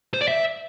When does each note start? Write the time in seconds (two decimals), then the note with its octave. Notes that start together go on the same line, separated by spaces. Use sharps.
0.14 C5
0.21 D5
0.28 E5